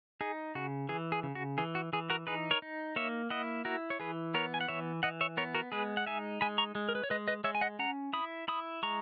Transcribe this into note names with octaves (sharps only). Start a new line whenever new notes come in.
D#4 G#4
C#3 F#4
E3 G#4
G#4
C#3
F#4
E3 G#4
F#4
E3 G#4
F#4 A#4
D#4 G#4 B4
A#4 C#5
D#4
A#3 C#5 E5
E4 D#5 F#5
E4 F#4 A#4
C#5
E3 G#4 B4
B3 A#4 C#5
G#5
F#5
E3 C#5 E5
E3 D#5 F#5
C#5 E5
B3 A#4 C#5
F#4 A#4
G#3 G#4 B4
F#5
D#4 E5 G#5
G#3 G#5 B5
A#5 C#6
G#3
A#4
B4
C#5
G#3 B4 D#5
B4 D#5
G#3 C#5 E5
G#5
D#5 F#5
C#4 F#5 A#5
E4 B5 D#6
E4 B5 D#6
G#3 A#5 C#6